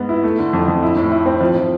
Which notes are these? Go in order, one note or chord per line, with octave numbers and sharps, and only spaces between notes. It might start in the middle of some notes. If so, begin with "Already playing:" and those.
Already playing: G#2 B3
E4
A3
D3
F2
F2
E4
A2
E4
C4
F3
F3